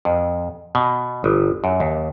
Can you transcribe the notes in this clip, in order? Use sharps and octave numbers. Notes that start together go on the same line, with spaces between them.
F2
B2
G1
F#2
D#2